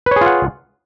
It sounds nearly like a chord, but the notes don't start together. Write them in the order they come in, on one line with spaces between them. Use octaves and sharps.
B4 C#5 G#4 F4 F#5